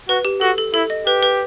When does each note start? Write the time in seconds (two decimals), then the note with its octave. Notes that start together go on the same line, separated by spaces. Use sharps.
0.09 F#4 B4
0.25 G4
0.41 F#4 A4
0.58 A4
0.74 E4 A4
0.90 D#5
1.06 G4 B4
1.23 B4